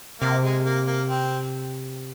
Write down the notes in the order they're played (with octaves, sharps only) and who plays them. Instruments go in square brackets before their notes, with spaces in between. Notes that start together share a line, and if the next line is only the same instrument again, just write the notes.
[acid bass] C3 [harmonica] A#3
[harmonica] G#3
A#3
A#3
C4